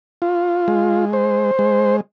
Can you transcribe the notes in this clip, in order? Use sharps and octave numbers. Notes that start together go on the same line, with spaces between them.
F4
G#3
C5
G#3